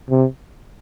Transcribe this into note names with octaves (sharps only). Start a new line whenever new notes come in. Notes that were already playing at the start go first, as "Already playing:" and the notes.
C3